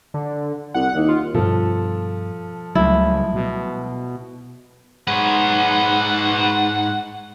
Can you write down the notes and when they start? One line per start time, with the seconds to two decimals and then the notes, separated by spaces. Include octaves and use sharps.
0.14 D3
0.74 C2 F#5
0.94 D#2
1.08 F4
1.34 G2 B2 F3 A4
2.75 C#2 F#3 G3 A3 E4
3.34 B2
5.08 G#2 B4 C#5 F#5